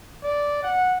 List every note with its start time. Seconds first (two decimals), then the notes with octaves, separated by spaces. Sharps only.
0.24 D5
0.63 F#5